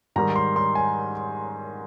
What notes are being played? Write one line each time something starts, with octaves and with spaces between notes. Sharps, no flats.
G#2 D#3 G3 A#5
C6
C6
G#5